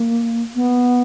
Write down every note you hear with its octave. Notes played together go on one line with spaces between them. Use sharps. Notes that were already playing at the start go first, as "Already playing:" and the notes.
Already playing: A#3
B3